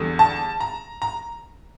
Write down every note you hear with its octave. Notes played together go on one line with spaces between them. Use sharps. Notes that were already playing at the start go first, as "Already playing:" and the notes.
Already playing: E2 D3 G3
A5
A#5
A#5